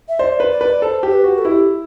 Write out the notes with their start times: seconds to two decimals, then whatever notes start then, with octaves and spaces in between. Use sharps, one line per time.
0.08 E5
0.19 C5 D5
0.40 B4
0.50 D5
0.61 B4
0.82 A4 C5
1.03 G4
1.10 C5
1.13 B4
1.24 F#4
1.38 A4
1.45 E4 G4